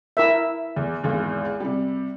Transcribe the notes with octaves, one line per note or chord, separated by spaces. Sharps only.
E4 A#4 E5
E2
G#1 E2 G#3
C3 G3